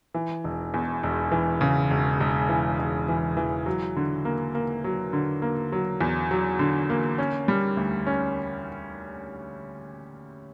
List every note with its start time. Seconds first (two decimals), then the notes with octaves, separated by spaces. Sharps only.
0.14 E3
0.44 E1
0.74 E2
1.03 E1
1.32 E3
1.61 C#3
1.91 E1
2.20 E1
2.49 E3
2.79 E1
3.08 E3
3.37 E3
3.66 F#3
3.96 D3
4.25 A#3
4.55 A#3
4.84 F#3
5.13 D3
5.42 A#3
5.72 F#3
6.01 E2
6.31 F#3
6.59 D3
6.90 A#3
7.18 C#4
7.48 G3
7.77 D2
8.07 C#4